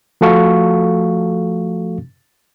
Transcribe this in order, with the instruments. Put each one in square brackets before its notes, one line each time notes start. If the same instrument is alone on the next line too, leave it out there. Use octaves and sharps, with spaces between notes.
[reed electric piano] F3 A3 F#4 A4 F5 C#6